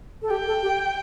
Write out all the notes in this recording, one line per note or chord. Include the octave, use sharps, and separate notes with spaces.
A4
G4 G5
A4
G4